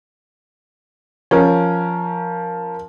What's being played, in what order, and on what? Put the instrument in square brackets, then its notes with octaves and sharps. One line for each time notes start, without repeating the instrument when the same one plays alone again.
[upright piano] F3 A#4 [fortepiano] C#4